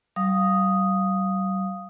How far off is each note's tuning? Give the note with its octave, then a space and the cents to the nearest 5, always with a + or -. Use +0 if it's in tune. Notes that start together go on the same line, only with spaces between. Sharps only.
G3 -45 F5 +0 D#6 +0